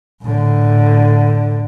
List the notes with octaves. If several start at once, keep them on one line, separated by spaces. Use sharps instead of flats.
A2 D3